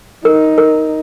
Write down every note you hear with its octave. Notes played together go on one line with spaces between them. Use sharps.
D#4 A#4
A#4